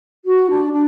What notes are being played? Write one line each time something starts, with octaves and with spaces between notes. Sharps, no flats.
F#4
D4
D4